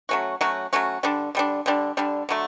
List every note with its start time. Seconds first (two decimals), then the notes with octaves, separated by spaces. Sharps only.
0.09 F#3 A3 C#4 F#4
0.41 F#3 A3 C#4 F#4
0.73 F#3 A3 C#4 F#4
1.03 D3 G3 D4
1.35 D3 G3 D4
1.66 D3 G3 D4
1.97 D3 G3 D4
2.29 D3 F#3 A3